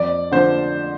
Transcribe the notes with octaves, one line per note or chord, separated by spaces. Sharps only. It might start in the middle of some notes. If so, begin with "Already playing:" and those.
Already playing: F2 D5
D3 F3 C5